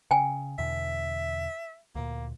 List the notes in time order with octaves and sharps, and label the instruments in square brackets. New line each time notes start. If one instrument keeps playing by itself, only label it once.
[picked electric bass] C#3 [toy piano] G5 G#5
[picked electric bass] E2 B2 D3 [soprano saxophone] E5
[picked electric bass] D2 A#2 [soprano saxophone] A#3